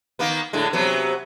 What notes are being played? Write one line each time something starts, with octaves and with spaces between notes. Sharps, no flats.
D#3 A#3 B3
A2 D3 G#3
C3 F#3 B3